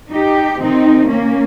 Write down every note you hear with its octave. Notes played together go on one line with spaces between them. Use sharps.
D#4 G4
C3 D#3 C4 D#4
A#3 C#4